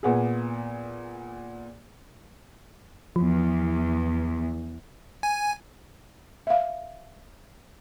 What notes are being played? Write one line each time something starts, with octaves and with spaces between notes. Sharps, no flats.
A#2 B3 G#4
E2 F3
G#5
E5 F5